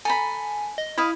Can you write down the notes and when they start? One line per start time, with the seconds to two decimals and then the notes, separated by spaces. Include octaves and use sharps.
0.05 A4 G#5 A#5 B5
0.78 D#5
0.98 E4 D#5 F5 B5